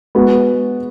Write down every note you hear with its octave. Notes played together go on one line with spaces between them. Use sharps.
G#3 B3 F#4